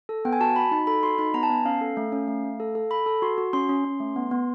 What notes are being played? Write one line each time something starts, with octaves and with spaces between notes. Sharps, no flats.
A4
B3 G5
G#5
F#4 A5
F#4 B5
D#4 B5
A4 B5
F#4 C6
D#4 B5
B3 A#5
A5
B3 G#5
C#4 F5
A4
A3
C#4
A3
A3
A4
A4
A4 B5
A4
F#4 C6
F#4
C#4 C6
C#4
C#4
A3
B3
B3